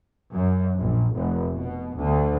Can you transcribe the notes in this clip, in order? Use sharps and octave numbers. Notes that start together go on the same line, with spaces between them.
F#2
A#1
F1
B2
D2